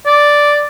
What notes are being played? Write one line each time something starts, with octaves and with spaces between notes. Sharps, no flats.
D5